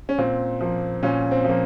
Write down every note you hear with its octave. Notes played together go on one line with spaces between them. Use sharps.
C#4
A#2 C4
F3 A#3
A#2 C#4
C4
F3 A#3